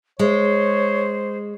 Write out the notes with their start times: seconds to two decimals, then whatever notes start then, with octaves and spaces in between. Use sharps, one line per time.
0.19 G#3 C5 C#5